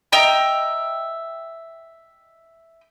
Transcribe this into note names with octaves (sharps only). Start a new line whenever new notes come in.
D#5 E5 G5 A#5